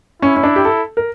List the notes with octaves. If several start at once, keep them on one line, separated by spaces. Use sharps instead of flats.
C#4 E4
C#4
D4
G4
A4
A#4